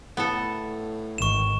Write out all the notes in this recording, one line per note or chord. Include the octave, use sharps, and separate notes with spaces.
A2 B3 A4
G#1 D#3 C#6 E7